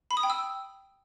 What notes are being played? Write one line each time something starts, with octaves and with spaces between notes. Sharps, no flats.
B5
D#6
G5
E6